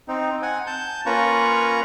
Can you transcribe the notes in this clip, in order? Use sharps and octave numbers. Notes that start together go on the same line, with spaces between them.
C4 D#4
F#5 G#5
A5 G6
A#3 C#4 F4 B4 A#5 C#6